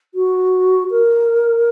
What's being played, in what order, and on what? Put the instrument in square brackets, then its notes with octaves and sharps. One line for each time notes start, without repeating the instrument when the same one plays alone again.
[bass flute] F#4
A#4